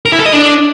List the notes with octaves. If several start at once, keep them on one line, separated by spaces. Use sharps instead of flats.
A#4
E4
A4
D#5
D4